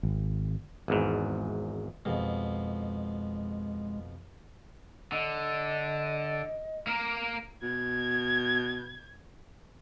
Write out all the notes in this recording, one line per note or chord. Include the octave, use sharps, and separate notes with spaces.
G#1
G#1 E2 G#2
F2 B2 G#3
D3 D#5
A#3 A#4
B2 G#6